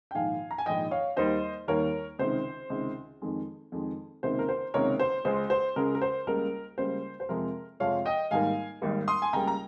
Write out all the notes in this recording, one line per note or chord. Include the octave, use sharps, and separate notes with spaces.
G5
A#1 G#2 D#3 F5 G#5
A#5
G#5
A#1 G#2 D#3 D#5 G5
C#5 F5
D#2 D#3 G3 A#3 C5 D#5
D#2 D#3 G3 A#3 A#4 C#5
C#2 C3 D#3 C5
C#2 C3 D#3
F2 D#3 G#3
F2 D#3 G#3
C#2 C3 D#3 A#3 C5
A#4
C5
C#2 C3 D#3 A#3 A#4 C#5
C5
C#2 C#3 G#3 C5
C5
C#2 C#3 G#3 A#4
A#4
C5
C#2 C#3 G3 A#3 A#4
C#2 C#3 G3 A#3 C5
C5
F2 C3 F3 G#3 A#4
F2 C3 F3 G#3 C#5 F5
D#5 G5
G#1 G#2 G3 A#3 F5 G#5
G#1 G#2 G3 A#3
C6 D#6
G#5
C#2 C#3 G3 A#3 G5 A#5
A#5